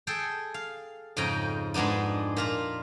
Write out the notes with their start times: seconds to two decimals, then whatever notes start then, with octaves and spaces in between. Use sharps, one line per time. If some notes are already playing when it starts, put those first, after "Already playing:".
0.07 G#4 A4 G5
0.54 F5
1.17 F2 G#2 C#3 D#5 G5 A#5
1.74 G#2 G#3 B3 D4 D#4
2.36 A#2 F4 A#5